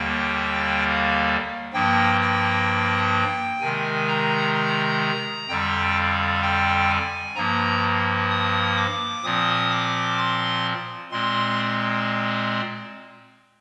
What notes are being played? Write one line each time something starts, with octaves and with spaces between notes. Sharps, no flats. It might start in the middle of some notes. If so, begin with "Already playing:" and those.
Already playing: D#2 D3 G3 A#3 G5
F5
G2 F3 A#3 G5
G5
C3 D#3 G#3 G#5
A#5
A#5
F2 D3 G3 G5
F5
G5
G#5
G2 F3 A#3 A#5
D#6
D6
A#2 F3 C4 D#6
D6
C6
A#2 G#3 C4 C6